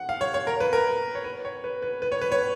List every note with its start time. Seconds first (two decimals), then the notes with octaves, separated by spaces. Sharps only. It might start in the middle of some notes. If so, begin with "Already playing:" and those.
Already playing: F#5
0.09 F5
0.21 C#5
0.34 C#5
0.47 A#4
0.60 B4
0.73 A#4
1.15 C#5
1.24 B4
1.45 C#5
1.64 B4
1.82 B4
2.02 B4
2.12 C#5
2.21 B4
2.32 C#5